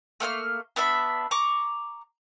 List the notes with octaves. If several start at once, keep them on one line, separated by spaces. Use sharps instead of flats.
A3 A#3 C6 F6
B3 D4 E5 B5
A#5 C#6 D6